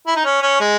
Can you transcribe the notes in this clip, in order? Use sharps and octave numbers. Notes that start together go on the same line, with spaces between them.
E4
D#4
C#4
C#4
G#3